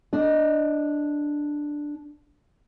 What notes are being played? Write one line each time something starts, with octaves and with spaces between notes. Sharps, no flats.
D4 D5 D#5